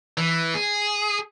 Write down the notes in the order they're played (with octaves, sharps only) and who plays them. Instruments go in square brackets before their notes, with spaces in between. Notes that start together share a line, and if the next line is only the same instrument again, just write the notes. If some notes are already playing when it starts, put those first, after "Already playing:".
[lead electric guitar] E3
G#4